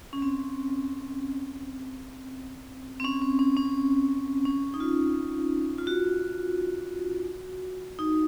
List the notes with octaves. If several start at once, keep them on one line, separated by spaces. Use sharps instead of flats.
C#4
C4
C4
C#4
C4
C#4
C#4
C#4
D#4
F4
F4
F#4
D#4